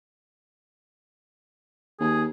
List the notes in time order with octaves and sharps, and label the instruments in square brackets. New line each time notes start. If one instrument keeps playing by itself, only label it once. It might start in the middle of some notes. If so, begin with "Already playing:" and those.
[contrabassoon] D#2 [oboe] G#4